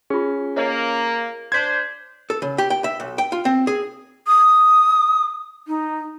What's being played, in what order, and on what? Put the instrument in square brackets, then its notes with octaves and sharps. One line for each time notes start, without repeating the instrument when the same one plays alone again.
[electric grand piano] C#4 [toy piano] F4 G#4
[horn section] A#3 [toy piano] C#5 D#5
[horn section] D4 C5 [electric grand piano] G#6 B6
[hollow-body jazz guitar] A4
C#3
G4
G5
E5
B1
G5
F4
C4
G#4
[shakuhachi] D#6
D#4